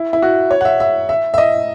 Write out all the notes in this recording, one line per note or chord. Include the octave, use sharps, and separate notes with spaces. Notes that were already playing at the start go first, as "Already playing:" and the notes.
Already playing: E4
E4
F#4
C#5
F#5
E5
E5
E5
E5
D#5